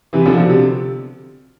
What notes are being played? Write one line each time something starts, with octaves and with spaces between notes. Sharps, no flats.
C3 E3
D3 F3
B2 D3
C3